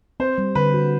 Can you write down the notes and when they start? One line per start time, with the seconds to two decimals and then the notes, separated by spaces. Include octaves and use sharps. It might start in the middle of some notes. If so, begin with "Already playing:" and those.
0.20 C4 C5
0.38 G3
0.55 D3 B4
0.74 F#4